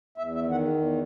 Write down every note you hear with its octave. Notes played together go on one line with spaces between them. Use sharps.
E2 E5
E5
D#3
F#5
E2